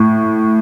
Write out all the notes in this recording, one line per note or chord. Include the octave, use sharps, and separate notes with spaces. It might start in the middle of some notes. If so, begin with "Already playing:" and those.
Already playing: A2